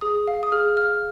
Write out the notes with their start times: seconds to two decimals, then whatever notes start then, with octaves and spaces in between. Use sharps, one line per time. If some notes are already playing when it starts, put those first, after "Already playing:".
0.01 G#4 D#6
0.28 F5
0.43 D#6
0.52 G#4 F6
0.77 F5 F6